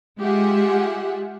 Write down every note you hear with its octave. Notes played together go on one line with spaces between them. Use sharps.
G#3 F4 G4 G#4 E5 F#5